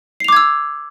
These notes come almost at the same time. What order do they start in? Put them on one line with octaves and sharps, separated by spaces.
C7 F7 D6 G#6 E6